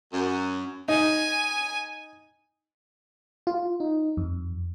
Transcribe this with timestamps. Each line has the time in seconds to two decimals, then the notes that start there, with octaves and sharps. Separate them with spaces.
0.13 F#2
0.88 D#4 G#5
3.47 F4
3.80 D#4
4.17 F2